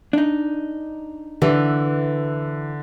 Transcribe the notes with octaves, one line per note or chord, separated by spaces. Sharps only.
D4 D#4
D3 E3